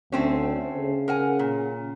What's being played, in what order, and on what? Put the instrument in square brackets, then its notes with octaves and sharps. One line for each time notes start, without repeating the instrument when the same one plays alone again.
[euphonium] D2 [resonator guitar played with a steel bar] A3 C4 C#4
[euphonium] C#3
[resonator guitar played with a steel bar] A#4 F#5 G#5
A#2